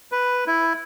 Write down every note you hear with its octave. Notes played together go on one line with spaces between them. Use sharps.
B4
E4